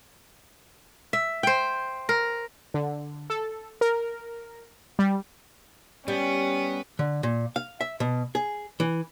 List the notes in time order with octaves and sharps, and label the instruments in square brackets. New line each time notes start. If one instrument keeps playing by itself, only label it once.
[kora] E5
C5 G5
A#4
[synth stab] D3
A4
A#4
G3
[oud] G3 [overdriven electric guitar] B3 [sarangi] C#4
[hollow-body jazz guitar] D3
A#2
F5
E5
B2
G#4
E3